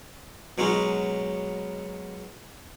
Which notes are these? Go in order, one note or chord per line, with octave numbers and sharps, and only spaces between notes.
B2 F#3 G#3 C#4 D#4